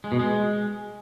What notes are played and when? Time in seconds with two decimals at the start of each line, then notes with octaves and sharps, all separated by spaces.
0.04 G#3
0.12 B2
0.19 G#3